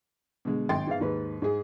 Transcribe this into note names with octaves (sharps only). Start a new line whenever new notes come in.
B2 D3 G#3
G#1 G5 C6 A6
G#2 B3 F5
D#2 G#2 B4
G#2 G#4